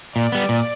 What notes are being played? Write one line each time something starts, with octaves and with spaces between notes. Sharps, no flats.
A#2 D5
G3 B3
A#2